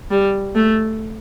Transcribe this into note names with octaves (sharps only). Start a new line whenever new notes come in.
G3
A3